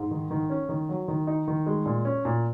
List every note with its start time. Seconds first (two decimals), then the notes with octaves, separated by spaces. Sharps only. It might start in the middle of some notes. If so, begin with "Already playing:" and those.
Already playing: G#2
0.11 D#3
0.31 D#3
0.50 C#4
0.69 D#3
0.89 F#3
1.08 D#3
1.27 D#4
1.47 D#3
1.66 G#3
1.86 A#2
2.05 C#4
2.25 A#2